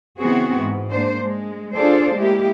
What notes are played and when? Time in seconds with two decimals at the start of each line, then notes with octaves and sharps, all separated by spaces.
0.18 C#3 E3 B3 C4 F#4 G#4
0.57 G#2
0.90 G#3 A#3 D4 C5
1.22 G#3
1.75 D4 F4 G#4 A4 C5 D5
2.15 G#3 A#3 E4 G4